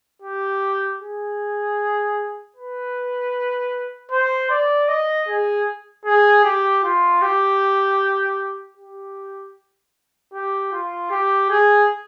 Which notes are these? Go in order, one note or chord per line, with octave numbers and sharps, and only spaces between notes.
G4
G#4
B4
C5
D5
D#5
G#4
G#4
G4
F4
G4
G4
G4
F4
G4
G#4